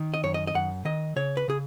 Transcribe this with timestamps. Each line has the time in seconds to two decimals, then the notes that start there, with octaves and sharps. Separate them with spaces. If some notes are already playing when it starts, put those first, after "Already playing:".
Already playing: D#3
0.14 D#5
0.23 F#2 C#5
0.34 D#5
0.47 D#5
0.54 F#2 F#5
0.85 D#3 D#5
1.16 C#3 C#5
1.37 B4
1.48 C#3 G#4